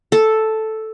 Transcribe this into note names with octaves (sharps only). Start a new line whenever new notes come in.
A4